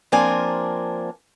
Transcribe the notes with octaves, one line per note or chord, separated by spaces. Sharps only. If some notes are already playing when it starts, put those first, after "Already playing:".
F3 A#3 C4 D4 A#4 G#5